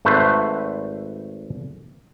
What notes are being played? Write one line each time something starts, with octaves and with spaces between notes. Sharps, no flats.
G#1 A3 B4 C5